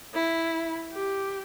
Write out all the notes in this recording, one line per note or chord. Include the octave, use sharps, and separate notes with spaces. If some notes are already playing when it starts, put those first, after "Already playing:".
E4
G4